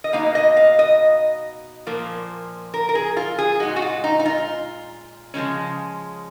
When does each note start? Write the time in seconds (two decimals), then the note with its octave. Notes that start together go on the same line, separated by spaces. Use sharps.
0.04 D#5
0.13 B2 A#3 D#4 F5
0.35 D#5
0.57 F5
0.79 D#5
1.87 A#2 F3 A#3
2.74 A#4
2.89 A#4
2.95 G#4
3.17 F4
3.38 G#4
3.60 A#2 G#3 D#4 F#4
3.76 F#4
3.82 F4
4.04 D#4
4.19 D#4
4.26 F4
5.34 C#3 F3 G#3 C#4